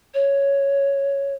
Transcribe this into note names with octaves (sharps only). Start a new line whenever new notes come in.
C#5